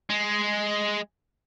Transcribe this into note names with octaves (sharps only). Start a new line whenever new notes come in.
G#3